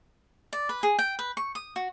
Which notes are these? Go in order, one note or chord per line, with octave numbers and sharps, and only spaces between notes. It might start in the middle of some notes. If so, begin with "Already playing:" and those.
D5
B4
G#4
G5
B4
C#6
D#6
F#4